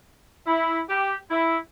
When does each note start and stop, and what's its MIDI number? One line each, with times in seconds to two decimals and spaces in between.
0.47 0.81 64
0.89 1.16 67
1.31 1.57 64